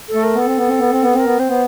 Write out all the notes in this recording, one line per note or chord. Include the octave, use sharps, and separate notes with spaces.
A4
A3
A#4
B3
A4
C4
B3
C4
B3
C4
B3
C4 A#4
B3
C4 C5
B3